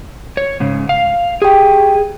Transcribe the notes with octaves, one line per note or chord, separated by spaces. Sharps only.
C#5
G#2 C#3
F5
G4 G#4 G5